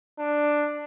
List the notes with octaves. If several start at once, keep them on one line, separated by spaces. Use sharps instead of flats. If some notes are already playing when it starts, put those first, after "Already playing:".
D4